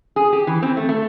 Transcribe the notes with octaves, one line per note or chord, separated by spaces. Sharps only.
G#4
G4
E3
C4
A3
A3